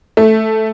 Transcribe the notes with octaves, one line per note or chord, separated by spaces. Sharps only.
A3